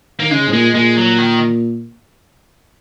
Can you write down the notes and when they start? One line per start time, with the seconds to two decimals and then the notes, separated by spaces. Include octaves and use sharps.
0.19 D#3 A#3
0.31 C#3 G#3
0.48 G#2
0.53 A#2 G#3
0.75 A#2 G#3
0.97 F#3
1.18 D#3